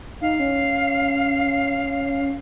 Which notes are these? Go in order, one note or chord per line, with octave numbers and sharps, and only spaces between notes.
D#4 F5
C#4